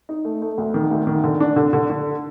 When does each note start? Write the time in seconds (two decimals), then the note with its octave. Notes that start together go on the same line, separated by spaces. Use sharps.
0.09 D#4
0.25 A3
0.42 A3
0.58 D2
0.74 D#3
0.91 D2
1.07 D#3
1.24 D3
1.40 D4
1.56 D3
1.73 D3
1.90 D3